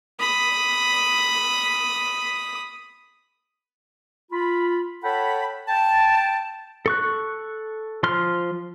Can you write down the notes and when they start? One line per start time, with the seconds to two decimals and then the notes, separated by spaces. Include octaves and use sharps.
0.19 B5 D#6
4.32 F4 B5
5.04 A4 C#5 F#5 G5 A5 B5
5.68 G5 A5
6.86 A4 C#6 F#6
8.03 F3 C6 F6